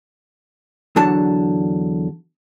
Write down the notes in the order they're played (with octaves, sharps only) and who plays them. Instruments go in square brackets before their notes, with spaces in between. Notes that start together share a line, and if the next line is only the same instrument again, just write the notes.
[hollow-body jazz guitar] E2 D3 F#3 D4 A5